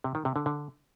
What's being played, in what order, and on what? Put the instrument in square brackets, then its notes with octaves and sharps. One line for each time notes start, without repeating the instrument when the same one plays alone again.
[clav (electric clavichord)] C3
D#3
C3
D3
D3